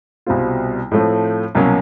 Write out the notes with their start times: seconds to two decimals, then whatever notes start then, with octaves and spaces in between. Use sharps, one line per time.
0.26 C2 B2 G3 C4 F4
0.91 A2 F3 A3 C4
1.55 C2 B2 F#3 A#3 C#4